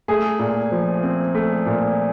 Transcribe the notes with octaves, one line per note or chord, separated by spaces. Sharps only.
A3 G#4
A#2
F3
C4
A3
A#2